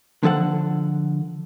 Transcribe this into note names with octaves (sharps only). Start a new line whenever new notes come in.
D3 F3 A4 F#5